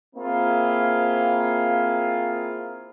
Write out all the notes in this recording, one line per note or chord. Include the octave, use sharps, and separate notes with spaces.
A#3 C4 E4 F4 G#4